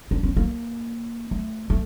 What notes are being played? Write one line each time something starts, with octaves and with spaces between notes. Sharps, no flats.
D4
C#4
A#3
A3
A3